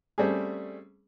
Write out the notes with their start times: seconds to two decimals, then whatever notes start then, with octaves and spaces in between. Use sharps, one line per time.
0.18 G3 A3 C4 C#4 G#4